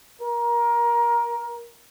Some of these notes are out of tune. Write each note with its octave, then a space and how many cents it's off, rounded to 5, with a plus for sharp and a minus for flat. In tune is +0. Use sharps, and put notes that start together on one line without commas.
A#4 +20